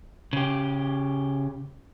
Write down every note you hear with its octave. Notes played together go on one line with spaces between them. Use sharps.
C#3 G4